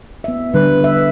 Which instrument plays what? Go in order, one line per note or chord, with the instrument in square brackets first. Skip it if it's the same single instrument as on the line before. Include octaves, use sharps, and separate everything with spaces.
[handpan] B3 E5
[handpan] D3 G3 [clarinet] B4
[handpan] E5